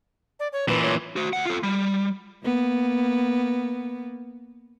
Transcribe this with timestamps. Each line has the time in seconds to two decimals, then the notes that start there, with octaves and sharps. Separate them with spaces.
0.40 D5
0.53 C#5
0.69 A#2 E3 B4
0.83 C#5
1.16 F#4 C5
1.33 D2 F#5
1.45 F4 A4
1.63 G3
2.44 A#3 B3